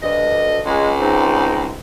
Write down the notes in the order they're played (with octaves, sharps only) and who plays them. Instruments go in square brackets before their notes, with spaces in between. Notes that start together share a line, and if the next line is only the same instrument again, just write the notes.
[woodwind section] D2 G2 D#5
[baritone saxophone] C#2 [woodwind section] G#3
[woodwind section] G#2 C4 D#4